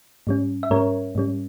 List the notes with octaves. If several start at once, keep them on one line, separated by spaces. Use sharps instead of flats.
G#2 G3 C#4
E5
G#2 G3 C#4 A#4 C#5
G#2 G3 C#4